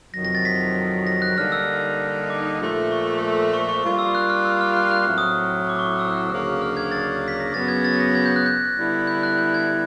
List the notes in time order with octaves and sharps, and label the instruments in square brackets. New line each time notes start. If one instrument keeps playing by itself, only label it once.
[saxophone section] F2 C3 D#3 F#3 [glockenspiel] A#6
[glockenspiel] A#6
A6
B6
A#6
F#6
[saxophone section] D3 G3 A#3 D#4 [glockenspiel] F6
[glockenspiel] E6
D6
[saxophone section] A#2 F3 A3
[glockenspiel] C#6
C#6
C#6
[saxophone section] G3 A#3 D4 F4 [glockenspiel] C#6
[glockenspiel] E6
F#6
F6
E6
F6
F#6
F6
F#6
[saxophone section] A2 F#3 A3 C4 E4 [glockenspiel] F6
[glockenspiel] D#6
D#6
D6
C#6
D6
E6
[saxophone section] D2 C#3 F#3 A#3 D4
[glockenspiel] F6
G#6
A6
B6
A#6
[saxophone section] F#2 C#3 F#3 B3 [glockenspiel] A6
[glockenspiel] G#6
A6
A#6
G#6
G6
F#6
G6
[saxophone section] D3 G3 B3 E4
[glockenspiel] G6
F#6
G6
G#6